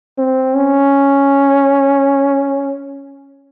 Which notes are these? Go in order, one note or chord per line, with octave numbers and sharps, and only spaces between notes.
C4
C#4